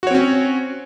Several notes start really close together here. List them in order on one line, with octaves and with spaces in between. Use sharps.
F#4 C#5 C4 C#4